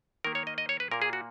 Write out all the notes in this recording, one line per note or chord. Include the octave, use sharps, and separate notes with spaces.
D#3 A#3 A#4
C#5
D#5
D#5
C#5
B4
A#2 A#3 A#4
G#4
F#4